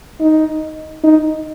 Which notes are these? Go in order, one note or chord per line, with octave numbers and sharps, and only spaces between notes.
D#4
D#4